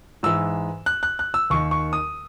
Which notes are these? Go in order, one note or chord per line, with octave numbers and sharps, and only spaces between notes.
G#2 E3 E6
F#6
F#6
F#6
E6
D#2 D#3 C#6
C#6
D#6